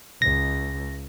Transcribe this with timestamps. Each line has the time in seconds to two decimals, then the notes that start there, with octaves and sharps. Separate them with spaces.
0.22 C#2 A#6